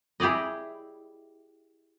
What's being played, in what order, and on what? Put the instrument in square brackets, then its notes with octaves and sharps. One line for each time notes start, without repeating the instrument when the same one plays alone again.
[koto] E4 G4 G#4 D5 D#5